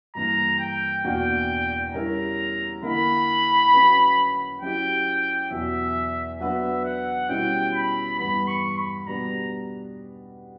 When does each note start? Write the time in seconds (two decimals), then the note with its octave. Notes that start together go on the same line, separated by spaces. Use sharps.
0.15 G2 E3 A#3 A#5
0.59 G5
1.04 E2 B2 A#3 D4 F#4 G5
1.93 C#3 G3 C#4 E4 A#4 A#5
2.83 D3 A#3 E4 A#4 B5
3.72 C#3 F#3 C#4 F#4 B4
4.61 F#3 C#4 E4 G4 G5
5.51 E2 B2 F#3 E5
6.40 F#3 B3 D4 F#4 B4 E5
6.84 F#5
7.29 B2 G3 C#4 E4 G5
7.74 B5
8.18 G2 E3 G3 B3 B5
8.48 C#6
8.78 B5
9.07 B2 G3 B3 D4 A#5